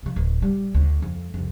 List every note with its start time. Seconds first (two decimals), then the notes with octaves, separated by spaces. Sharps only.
0.03 C3 F3
0.16 D1
0.42 G3
0.74 D2
1.02 F2
1.34 C2 F2